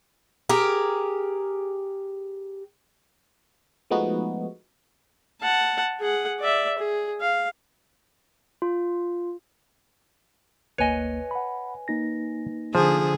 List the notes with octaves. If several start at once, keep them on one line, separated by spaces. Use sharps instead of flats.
G4 G#4 A#4
F3 G#3 A3 B3 D#4 F#4
F#5 A5
G#4 F#5
D5 E5
G#4
F5
F4
G1 D2 A#3 B4 C#5 D#5 G#5
F#5 B5
A#3 D#4 A#6
D3 F3 G#4 C5